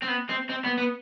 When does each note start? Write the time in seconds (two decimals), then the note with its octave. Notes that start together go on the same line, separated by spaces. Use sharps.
0.02 C4
0.07 B3
0.29 C4
0.49 C4
0.65 B3
0.78 B3